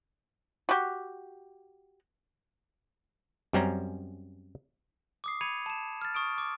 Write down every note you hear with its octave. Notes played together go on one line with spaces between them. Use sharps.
F#4 G4
F#2 G3 C4 C#4 A#5
D6 D#6 C7
B5 G#6 C#7 D#7 F7
A5 E7
F6 A6
C#6 D#6 D7
D6